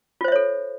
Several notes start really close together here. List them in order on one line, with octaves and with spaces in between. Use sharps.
F4 C5 E5 C#5 A4